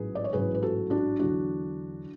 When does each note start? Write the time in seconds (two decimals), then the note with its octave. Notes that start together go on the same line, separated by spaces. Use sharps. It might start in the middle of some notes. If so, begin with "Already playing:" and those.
Already playing: A1 G#2 F#3 G#4 B4
0.15 D5
0.24 C#5
0.33 A1 G#2 F#3 G#4 B4
0.54 B4
0.62 F#4 A4
0.90 D4 F#4
1.19 E2 D3 F#3 D4 F#4